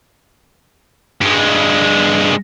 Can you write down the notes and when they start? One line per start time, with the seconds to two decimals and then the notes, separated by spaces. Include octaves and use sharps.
1.21 G2 G#3